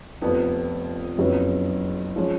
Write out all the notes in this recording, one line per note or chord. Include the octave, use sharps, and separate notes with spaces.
F1 F2 F3 B3
F#1 F2 C#3 F#3 B3
F3 G#3 C#4